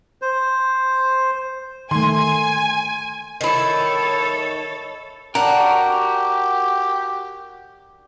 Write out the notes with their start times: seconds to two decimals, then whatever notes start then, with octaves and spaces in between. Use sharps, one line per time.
0.22 C5
1.91 D#3 A3 G#5 C6
3.41 D#3 E4 A4 C#5
5.35 D4 F#4 G4 A#4